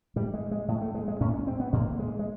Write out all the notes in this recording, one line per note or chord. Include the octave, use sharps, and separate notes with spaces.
A2 G3
G#3
G#3
A2 G#3
A3
G#3
G#3
A2 C#4
C#4
C4
B3
A2 A#3
G#3
G#3